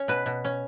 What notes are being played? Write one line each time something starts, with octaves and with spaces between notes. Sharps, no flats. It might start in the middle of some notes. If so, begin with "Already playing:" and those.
Already playing: C#4 C#5
B2 B4
B2
C#4